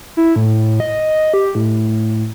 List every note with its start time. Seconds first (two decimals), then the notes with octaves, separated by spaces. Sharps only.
0.17 E4
0.36 A2
0.80 D#5
1.34 G4
1.55 A2